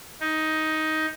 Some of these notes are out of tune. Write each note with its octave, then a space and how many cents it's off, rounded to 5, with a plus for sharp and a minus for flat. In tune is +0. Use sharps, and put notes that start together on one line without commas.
D#4 +10